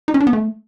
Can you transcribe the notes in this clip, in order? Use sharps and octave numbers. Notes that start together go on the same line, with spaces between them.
D#4
C#4
D4
B3
A3